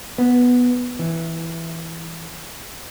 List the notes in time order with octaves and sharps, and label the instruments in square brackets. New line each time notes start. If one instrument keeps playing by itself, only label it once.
[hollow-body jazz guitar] B3
E3